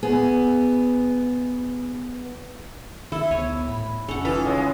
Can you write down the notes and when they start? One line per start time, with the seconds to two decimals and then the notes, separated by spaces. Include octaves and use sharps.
0.03 B3 G#4
3.12 D#3 E4 A4
3.31 D2 B3 C#5 E6
3.68 A2 B5
4.08 F1 C#4 A4 F#5 G#5
4.25 E3 G3 C#4 D#4 F4 A4
4.45 C#3 G#3